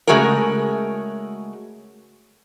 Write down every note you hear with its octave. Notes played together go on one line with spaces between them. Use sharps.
C#3 G#3 A3 F#4 G#4 A#4